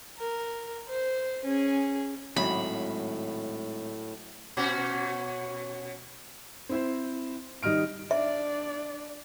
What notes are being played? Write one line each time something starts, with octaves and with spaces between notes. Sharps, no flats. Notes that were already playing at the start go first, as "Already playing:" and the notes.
A#4
C5
C#4 G#4
G#1 F#2 A2 B5
B2 C#4 F#4
C4 E4 C5
D#3 G3 D#5 F6 D7
D4 D5 E5